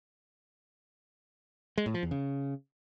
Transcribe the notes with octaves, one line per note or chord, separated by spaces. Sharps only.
G#3
A2
F3
E2
C#3